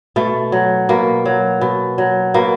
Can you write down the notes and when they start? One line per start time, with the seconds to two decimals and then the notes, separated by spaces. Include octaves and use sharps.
0.16 B2 A3
0.52 F#3
0.89 B2 A#3
1.25 F#3
1.61 B2
1.98 F#3
2.34 B2 A#3